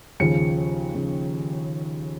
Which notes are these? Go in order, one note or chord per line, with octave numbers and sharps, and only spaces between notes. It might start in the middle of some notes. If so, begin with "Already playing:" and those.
D#2 C#3 F3 C#7
C#3 F3